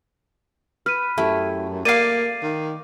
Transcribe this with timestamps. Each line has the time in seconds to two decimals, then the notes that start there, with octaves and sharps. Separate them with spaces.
0.86 B4 F6 D#7
1.18 F#2 A3 E4 G4
1.85 A#3 D5 F5 C7 D#7
2.43 D#3